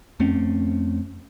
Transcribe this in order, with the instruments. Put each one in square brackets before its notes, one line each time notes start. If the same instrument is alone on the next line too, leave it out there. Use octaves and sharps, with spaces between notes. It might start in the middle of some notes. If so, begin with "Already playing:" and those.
[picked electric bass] F2 A3 C4 C#4